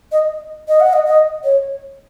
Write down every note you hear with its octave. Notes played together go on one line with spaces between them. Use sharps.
D#5
D#5
F#5
D#5
D#5
C#5